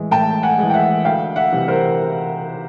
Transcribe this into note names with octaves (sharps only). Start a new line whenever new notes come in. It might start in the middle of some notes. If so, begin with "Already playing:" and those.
Already playing: A2 E3 G#3
A2 G5 A5
F#5 G#5
E3 G#3
G5
E5 F#5
D2 F5 G5
E5 F#5
C3 E3 G3
A#4 C5